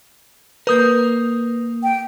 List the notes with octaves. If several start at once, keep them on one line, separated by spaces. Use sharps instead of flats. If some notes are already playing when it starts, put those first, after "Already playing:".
A#3 A#4 B4 D#6 G6
G5